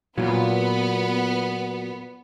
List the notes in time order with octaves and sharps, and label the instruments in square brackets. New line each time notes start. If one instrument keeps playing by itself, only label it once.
[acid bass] A#2 [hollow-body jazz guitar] F#3 F4 [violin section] B3